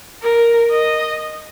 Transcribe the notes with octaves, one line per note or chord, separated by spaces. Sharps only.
A#4
D#5